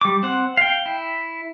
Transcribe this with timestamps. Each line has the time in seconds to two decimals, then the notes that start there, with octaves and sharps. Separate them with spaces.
0.01 G3 D6
0.23 C4 F#5
0.57 F5 G5
0.86 E4